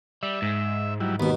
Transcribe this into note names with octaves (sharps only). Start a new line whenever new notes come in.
G3 E5
G#2
F#3 G3 E4
D#2 B2 B3